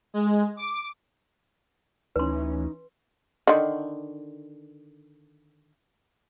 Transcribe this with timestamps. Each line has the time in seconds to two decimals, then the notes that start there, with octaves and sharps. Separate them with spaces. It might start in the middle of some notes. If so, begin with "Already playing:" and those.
0.14 G#3
0.57 D6
2.16 D2 E3 C#4 D#4 B4 C6
3.47 D3 D#3